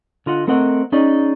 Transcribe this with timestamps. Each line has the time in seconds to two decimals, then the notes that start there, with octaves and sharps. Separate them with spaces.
0.26 D3 F4 D#5 F#5
0.47 A3 C4 A#4 D#5 F#5
0.92 C#4 D#4 G#4 D5 D#5